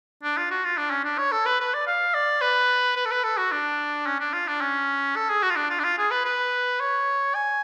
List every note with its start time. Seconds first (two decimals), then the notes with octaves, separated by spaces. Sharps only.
0.24 D4
0.37 F4
0.51 F#4
0.65 F4
0.77 D4
0.91 C#4
1.04 D4
1.18 C#5
1.32 A4
1.46 B4
1.60 B4
1.74 D5
1.87 F5
2.14 D5
2.41 B4
2.96 B4
3.06 A4
3.11 B4
3.23 A4
3.37 F#4
3.52 D4
4.06 C#4
4.20 D4
4.33 F4
4.48 D4
4.61 C#4
5.16 A4
5.29 G#4
5.42 F#4
5.50 F4
5.56 D4
5.70 F4
5.79 D4
5.84 F4
5.98 G#4
6.11 B4
6.25 B4
6.80 C#5
7.35 G#5